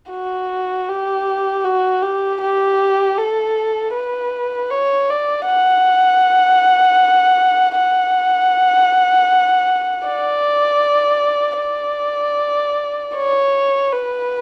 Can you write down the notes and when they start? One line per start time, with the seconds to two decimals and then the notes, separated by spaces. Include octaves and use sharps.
0.11 F#4
0.88 G4
1.64 F#4
2.02 G4
2.41 G4
3.18 A4
3.95 B4
4.71 C#5
5.10 D5
5.47 F#5
7.78 F#5
10.07 D5
11.61 D5
13.15 C#5
13.92 B4